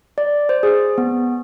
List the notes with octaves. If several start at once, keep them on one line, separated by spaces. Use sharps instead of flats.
D5
C5
G#4
B3